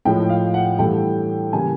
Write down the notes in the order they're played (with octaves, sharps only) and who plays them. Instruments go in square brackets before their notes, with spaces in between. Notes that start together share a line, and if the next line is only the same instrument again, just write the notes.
[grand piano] A2 F3 G#3 G5
F5
F#5
G2 E3 A3 G5
C#3 E3 G3 A#3 G#5